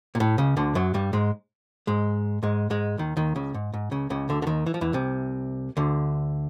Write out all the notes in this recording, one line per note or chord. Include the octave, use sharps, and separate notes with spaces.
A#2
A2
C#2 C#3
D2 D3
F#2 F#3
G2 G3
G#2 G#3
G#2 G#3
G#2 G#3
G#2 G#3
D#2 D#3
D#2 D#3
C#2 C#3
G#2
G#2
C#2 C#3
C#2 C#3
D2 D3
D3
D#2 D#3
E3
F3
E2 E3
C2 C3
D2 D3